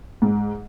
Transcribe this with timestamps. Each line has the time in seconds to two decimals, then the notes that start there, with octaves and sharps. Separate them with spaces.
0.22 G#2